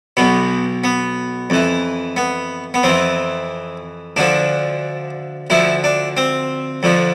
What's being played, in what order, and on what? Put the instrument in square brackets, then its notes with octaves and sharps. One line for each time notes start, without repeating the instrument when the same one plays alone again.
[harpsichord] B1 B2 B3
B3
F2 E3
B3
B3
F2 E3 C4
D2 D3 F3 D4
D2 D3 F3 E4
D4
C4
F2 D3 F3